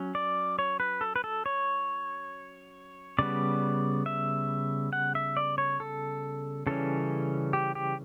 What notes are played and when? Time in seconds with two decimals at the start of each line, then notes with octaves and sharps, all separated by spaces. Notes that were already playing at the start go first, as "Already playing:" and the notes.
Already playing: F#3 C#4
0.15 D5
0.59 C#5
0.80 B4
1.01 A4
1.16 B4
1.24 A4
1.46 C#5
3.19 C#3 G3 B3 D5
4.06 E5
4.93 F#5
5.15 E5
5.37 D5
5.58 C#5
5.80 A4
6.67 C#3 E3 G3 C#4 A4
7.53 G4
7.75 G4